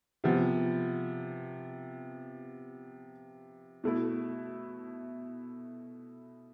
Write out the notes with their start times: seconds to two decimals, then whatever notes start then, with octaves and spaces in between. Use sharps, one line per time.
0.24 C3 F3 B3
3.84 B2 A3 E4